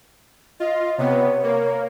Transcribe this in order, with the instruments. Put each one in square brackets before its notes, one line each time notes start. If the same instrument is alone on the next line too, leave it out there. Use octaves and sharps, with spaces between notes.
[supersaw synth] F4 [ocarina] D#5
[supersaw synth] C3 B3 [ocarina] C#5
[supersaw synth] A#3